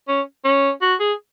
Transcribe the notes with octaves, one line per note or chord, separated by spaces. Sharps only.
C#4
C#4
F#4
G#4